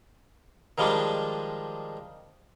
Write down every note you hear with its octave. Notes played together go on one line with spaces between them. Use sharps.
D#3 F3 G3 G#3 D4